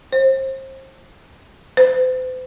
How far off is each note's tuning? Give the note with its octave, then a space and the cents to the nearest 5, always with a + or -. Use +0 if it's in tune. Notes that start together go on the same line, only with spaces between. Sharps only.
C5 +30
C5 -40